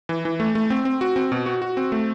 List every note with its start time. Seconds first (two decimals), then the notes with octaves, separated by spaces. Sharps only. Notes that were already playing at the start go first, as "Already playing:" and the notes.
0.09 E3
0.25 E3
0.40 A3
0.55 A3
0.70 C4
0.85 C4
1.01 F#4
1.16 C4
1.32 B2
1.46 F#4
1.62 F#4
1.77 C4
1.92 A3